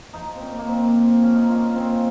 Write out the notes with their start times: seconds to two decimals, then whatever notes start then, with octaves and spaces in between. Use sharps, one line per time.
0.13 F3 D#4
0.36 C4
0.41 A#2 C#4
0.59 A#3
0.68 A#2 C4
0.95 F3
1.22 F3 C#4
1.35 D#4
1.49 A#2 F4
1.63 C#4
1.76 A#2 C4